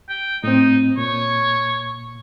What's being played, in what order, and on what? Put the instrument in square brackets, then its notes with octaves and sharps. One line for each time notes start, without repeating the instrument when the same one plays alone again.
[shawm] G5
[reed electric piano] A2 C4 [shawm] D#4
[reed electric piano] A#2 [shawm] C#5